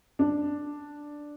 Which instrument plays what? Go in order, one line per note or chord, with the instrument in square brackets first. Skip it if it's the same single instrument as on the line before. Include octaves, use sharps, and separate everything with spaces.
[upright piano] D4